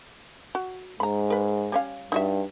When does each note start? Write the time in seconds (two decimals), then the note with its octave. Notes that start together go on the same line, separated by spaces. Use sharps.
0.55 F#4
1.00 G#2 A#5 B5
1.30 A#4 B4
1.72 G3 C#4 F5
2.12 G2 D#4 F#4 E5